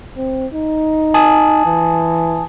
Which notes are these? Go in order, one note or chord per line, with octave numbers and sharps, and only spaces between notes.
C4
D#4
G#5 A5 D#6
E3